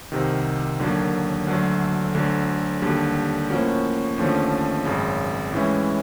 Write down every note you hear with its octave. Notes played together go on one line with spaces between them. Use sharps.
C2 C3 D#3
D#2 D3 F#3 A#3
D2 D3 F#3 A3
D2 D3 F#3
D#2 D3 G3
A2 F3 A#3 C#4 F#4
D#2 D3 F3 A3 C#4
G#1 F#2 C#3
A2 E3 G#3 C#4 E4